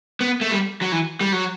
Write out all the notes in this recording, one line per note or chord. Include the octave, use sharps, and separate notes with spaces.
B3
A3
G3
F#3
E3
G3
F#3